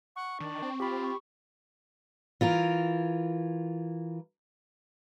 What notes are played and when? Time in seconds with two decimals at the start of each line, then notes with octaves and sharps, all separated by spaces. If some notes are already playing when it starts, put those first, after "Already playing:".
0.16 F#5 C#6
0.40 D#3 D4
0.62 C4
0.80 F4 G4 B5
1.04 C#6
2.41 E3 F4 A#4